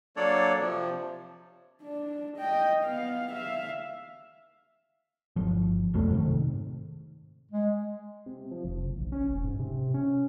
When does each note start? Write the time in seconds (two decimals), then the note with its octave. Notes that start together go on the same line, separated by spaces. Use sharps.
0.16 F#3 A#3 D4 A4 C#5 D5
0.59 C3 F3
1.82 D4
2.38 D#5 G5
2.85 B3 F5
3.32 E5 F5
5.36 G1 F3
5.94 B1 F2 A3 D4
6.10 G#2 C3 D#3
7.51 G#3
8.26 C3
8.51 F3
8.64 F1
8.82 F#1
8.98 A#1
9.12 C#4
9.30 E1
9.44 G#2
9.59 C3
9.94 C#4